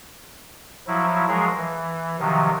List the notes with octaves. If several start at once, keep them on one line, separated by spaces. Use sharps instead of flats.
F3 F#3 E4
F3 F#3 G#3 G#4 A#4
E3
C3 D#3 F3 F#3